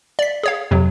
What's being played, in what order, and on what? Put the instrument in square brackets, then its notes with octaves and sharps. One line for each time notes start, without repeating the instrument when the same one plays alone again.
[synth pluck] D5 B6
G#4 C#5 F5
F2 C3 F#3